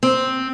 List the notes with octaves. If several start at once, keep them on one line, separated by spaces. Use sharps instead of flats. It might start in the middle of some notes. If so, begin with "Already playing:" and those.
C4